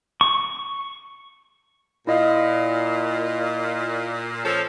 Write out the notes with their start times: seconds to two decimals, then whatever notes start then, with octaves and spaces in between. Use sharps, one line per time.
0.21 C#6
2.07 A#2 E4 D#5 F5
4.44 F3 C#4 A4